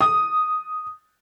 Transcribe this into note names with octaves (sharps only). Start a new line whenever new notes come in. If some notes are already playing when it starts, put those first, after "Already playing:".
D#6